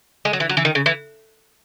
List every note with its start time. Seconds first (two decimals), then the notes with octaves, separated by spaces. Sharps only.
0.25 G#3
0.33 F#3
0.40 E3
0.49 F#3
0.57 E3
0.65 D#3
0.75 C#3
0.86 E3